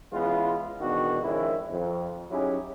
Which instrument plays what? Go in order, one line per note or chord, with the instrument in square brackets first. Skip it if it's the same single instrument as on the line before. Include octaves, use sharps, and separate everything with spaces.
[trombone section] E3 G#3 B3 C#4 E4 F4
G#1 E2 B2 D#3 D4 F#4
F2 D#3 G#3 C#4 E4
F2
F#3 C#4 D#4 E4 G4 G#4